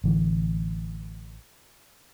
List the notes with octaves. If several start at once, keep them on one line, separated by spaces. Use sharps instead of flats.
A1 D3 E3